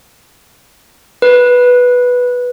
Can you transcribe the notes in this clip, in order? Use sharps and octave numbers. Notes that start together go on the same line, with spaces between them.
B4